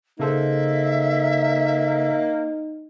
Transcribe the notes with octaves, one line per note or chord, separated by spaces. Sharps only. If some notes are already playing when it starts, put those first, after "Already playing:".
C#3 A#3 D#4 A4 C5 E5